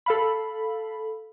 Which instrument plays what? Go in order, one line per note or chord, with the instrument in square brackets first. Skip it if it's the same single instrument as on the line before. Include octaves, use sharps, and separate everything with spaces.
[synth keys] A4 F5 B5